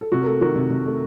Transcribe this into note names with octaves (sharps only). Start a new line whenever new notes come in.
A4
C3 F#4
A#4
A3 A4
D#3 F#4 A#4
C3
C3
A3